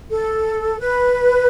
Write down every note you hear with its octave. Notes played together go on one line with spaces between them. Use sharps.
A4
B4